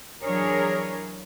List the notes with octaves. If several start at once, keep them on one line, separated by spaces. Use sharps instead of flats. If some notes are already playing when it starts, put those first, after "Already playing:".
E3 F#3 D4 G#4 A#4 C#5